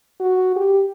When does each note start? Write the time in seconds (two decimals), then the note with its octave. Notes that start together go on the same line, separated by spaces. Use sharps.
0.20 F#4
0.56 G4